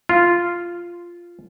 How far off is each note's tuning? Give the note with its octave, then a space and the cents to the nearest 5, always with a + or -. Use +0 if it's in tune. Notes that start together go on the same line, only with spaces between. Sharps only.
F4 -5